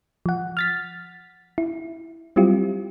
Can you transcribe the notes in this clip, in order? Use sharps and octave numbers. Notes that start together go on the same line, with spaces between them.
F3 F#5
F6 A6 B6
E4
F#3 G3 C4 E4 F4 G4